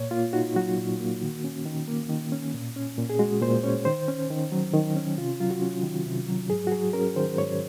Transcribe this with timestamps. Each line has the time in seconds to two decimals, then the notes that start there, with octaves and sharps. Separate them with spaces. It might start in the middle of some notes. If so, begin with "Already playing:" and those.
Already playing: A#2 C#5
0.11 A#3 F4
0.33 D#4 F#4
0.56 F#3 F#4
0.77 A#2
1.00 A#3
1.22 D#3
1.44 C#4
1.65 D#3
1.88 A#3
2.09 D#3
2.32 C#4
2.54 A#2
2.76 C#4
2.98 A#2
3.10 G#4
3.19 G#3 F#4
3.42 A#2 C5
3.63 C#4 C#5
3.85 D#3 C5
4.08 C#4
4.30 D#3
4.52 F#3
4.73 D#3
4.96 C#4
5.17 C3 F4
5.40 F#3 F4
5.51 F#4
5.62 C#4
5.83 D#3
6.06 C3
6.28 F#3
6.50 G#2 G#4
6.67 F#4
6.72 F#3 G#4
6.93 C#4 A#4
7.16 D#3 C5
7.38 G#2 C#5